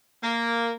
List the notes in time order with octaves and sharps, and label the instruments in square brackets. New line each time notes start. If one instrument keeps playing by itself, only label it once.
[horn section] A#3